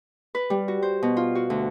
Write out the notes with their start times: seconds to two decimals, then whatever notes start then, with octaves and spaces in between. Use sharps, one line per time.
0.35 B4
0.50 G3
0.68 F#4
0.82 C5
1.03 B2
1.17 F4
1.35 F#4
1.50 D2